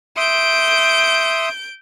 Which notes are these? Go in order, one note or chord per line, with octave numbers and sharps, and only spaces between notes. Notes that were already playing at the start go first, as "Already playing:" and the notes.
E5 C6 D#6 G6 D7